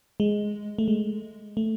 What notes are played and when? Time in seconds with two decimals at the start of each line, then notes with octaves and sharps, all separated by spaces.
0.20 G#3
0.78 A3
0.88 G#3
1.57 A3